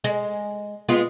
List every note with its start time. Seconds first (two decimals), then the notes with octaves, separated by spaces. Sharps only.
0.04 G#3
0.89 G#3 B3 F4